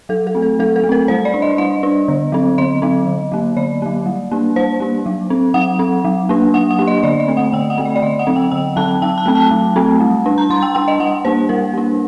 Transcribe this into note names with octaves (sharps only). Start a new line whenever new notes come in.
F#3 A4
A4
A3 C4
A4
F#3 A4
A4
A3
C4 A#4
G3 C5
D5
D4
D#5
G3 D#5
D4
D3
F#3 C4
D3 D#5
F#3 C4
D3
F#3 A#3
D3 D5
F#3 A#3
G3
A#3 D4
G3 C5
A#3 D4
F#3
C4
F#3 F#5
C4
F#3
A#3 D4
F#3 F#5
F#5
A#3 D4
D#5
D3 D5
D#5
A3 C4
F#5
D3 G5
F#5
A3 C4
D5
D5
D3 D#5
F#5
F#3 C4
G5
D3 G5
F#3 C4 A5
F#3 G5
A5
A3 C4
A5
F#3
A3 C4
G3
D4
A#5
G3 C6
G5
D4 G5
D#5
G3 F#5
A#3 D4 C5
G3 A#4
A#3 D4